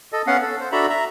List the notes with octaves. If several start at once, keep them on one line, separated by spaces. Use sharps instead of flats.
A4 D#5
B3 C#4 F5 F#5
A4
C5
D4 F#4 A4 E5 A#5 B5
E5 A#5